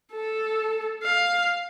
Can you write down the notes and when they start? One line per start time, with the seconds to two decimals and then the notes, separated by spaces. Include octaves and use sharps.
0.13 A4
1.04 F5